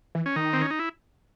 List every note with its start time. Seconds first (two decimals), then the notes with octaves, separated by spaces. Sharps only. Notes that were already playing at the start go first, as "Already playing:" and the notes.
0.15 E3
0.26 C#4
0.36 D#3 D#4
0.53 C4
0.62 C#4
0.70 D#4
0.79 E4